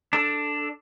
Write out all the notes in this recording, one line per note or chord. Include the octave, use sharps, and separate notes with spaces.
D4 A4